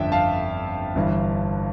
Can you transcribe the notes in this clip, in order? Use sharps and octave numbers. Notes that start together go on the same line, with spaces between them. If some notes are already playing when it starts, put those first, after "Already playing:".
Already playing: G1 F2 D3 A3 D4 E5 G5 A5
F5 A5
G1 G2 E3